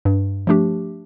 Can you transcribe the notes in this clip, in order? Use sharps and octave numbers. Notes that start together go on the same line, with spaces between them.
G2
F3 A3 D4 G4